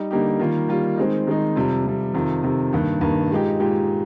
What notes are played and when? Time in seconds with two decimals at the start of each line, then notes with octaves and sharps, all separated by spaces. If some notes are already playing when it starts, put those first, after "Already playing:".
Already playing: G3 D#4 G4
0.11 D3 G3 A#3 D#4 G4
0.40 D#3 G3 A#3 F4
0.68 D#3 G3 A#3 F4
0.97 D#3 G#3 C4 D#4
1.27 D#3 G#3 C4 D#4
1.56 F2 C3 G3
1.85 F2 C3 G3
2.14 F2 C3 D#3
2.44 F2 C3 D#3
2.72 G2 D#3 A#3
3.01 G2 D#3 A#3
3.31 A#2 G#3 D#4 G4
3.60 A#2 G#3 D#4 G4